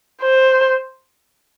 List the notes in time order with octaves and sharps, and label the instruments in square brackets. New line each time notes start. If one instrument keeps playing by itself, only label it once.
[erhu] C5